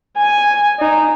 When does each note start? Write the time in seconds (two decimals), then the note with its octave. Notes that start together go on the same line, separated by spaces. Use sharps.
0.17 G#5
0.80 D#4